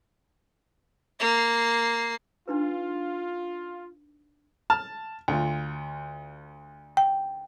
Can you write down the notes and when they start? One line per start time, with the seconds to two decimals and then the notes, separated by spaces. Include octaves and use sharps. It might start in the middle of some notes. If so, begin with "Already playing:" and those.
1.20 A#3 C7
2.48 D4 D#4 F4 B4
4.70 A5 F6
5.28 D2 F4
6.97 G5